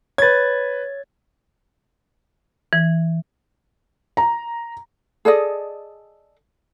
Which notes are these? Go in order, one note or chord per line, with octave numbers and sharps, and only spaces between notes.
B4 C#5 G#6 A6
E3
A#5
G#4 A4 D5 D#5